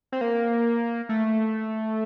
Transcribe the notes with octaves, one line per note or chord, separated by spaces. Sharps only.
C4
A#3
A3